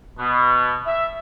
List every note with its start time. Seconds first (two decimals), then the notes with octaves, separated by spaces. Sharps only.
0.18 B2
0.86 E5